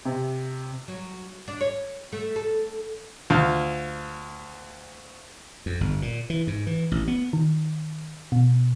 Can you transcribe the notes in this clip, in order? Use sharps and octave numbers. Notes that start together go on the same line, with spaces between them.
C3
F#3
D4
C#5
A3
A4
D2 F4
F2
G1
A#2
E3
G#2
E3
A1
B3
D#3
B2